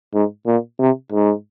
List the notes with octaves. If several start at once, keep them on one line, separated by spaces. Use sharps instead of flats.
G#2
A#2
C3
G#2